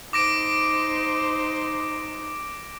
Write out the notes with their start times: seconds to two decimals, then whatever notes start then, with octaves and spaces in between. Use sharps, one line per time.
0.13 D#4 C5 D6 A#6 D7